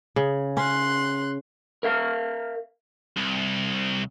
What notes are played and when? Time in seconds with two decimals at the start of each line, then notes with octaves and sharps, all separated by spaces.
0.16 C#3
0.57 C#4 C6 F#6
1.83 A#4 E5 F5
3.17 C2